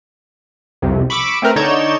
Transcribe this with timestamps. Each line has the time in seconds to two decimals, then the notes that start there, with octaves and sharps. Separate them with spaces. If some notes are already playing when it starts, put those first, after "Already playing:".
0.82 C2 F2 C3
1.10 B5 C#6 D6 E6
1.42 A3 C4 A#4 B4
1.56 D3 D#4 C#5 D5 G6 E7